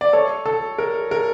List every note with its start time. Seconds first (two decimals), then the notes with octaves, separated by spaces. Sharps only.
0.01 D5
0.13 A4 C#5
0.46 A4
0.78 A#4
1.11 A#4